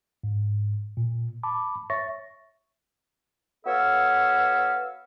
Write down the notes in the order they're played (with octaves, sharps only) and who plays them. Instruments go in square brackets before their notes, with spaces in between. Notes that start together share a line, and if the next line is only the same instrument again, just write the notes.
[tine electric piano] G#2
A#2
A5 B5 D6
C#5 E5 C#6 A6 A#6
[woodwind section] B3 F#4 A4 C#5 E5 F5